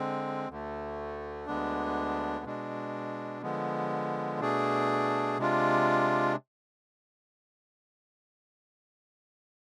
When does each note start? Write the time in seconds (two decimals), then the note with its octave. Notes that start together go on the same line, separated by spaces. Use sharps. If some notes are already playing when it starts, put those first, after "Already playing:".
Already playing: D3 G#3 C4
0.49 D2 D3 A3
1.46 D2 D3 G#3 B3 D4
2.45 B2 G#3 D4
3.42 D3 F3 G#3 B3
4.40 B2 A3 D4 G#4
5.38 C3 G#3 D4 F4